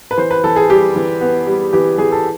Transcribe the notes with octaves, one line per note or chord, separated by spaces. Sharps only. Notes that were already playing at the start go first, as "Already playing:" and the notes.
B4
E3 C5
B4
E3 A4
G#4
G3 G4
E3
B3
G3
E3 G4
E3 G#4
A4